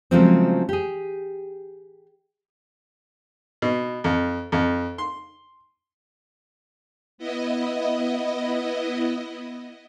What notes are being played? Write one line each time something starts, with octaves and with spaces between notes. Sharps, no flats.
C#3 F3 F#3 G#3 A3 C4
G4 G#4
B2
F2
F2
C6
B3 E4 D#5